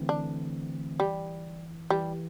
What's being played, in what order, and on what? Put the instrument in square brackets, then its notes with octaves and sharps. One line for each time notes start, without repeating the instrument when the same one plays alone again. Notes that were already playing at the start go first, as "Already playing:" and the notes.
Already playing: [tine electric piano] D3 E3 A3 C4
[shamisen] D4
G3
[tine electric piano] E3 [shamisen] G3